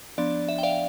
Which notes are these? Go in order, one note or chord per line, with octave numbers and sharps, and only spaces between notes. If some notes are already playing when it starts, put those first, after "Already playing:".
F3 B3 D4 D5
E5
G5
D5 F5